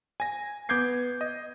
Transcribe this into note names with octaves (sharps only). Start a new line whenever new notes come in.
G#5 A#6
B3 D6 G6 G#6 C7
D#5